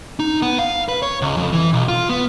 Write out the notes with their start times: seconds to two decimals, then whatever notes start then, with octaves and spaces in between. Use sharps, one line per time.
0.19 D#4
0.42 B3
0.59 F5
0.89 B4
1.03 C#5
1.22 C#2
1.37 F2
1.52 E3
1.73 B1
1.88 F4
2.09 B3